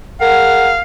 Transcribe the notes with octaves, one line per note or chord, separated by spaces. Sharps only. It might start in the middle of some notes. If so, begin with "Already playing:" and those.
G#4 A#4 F5 F#5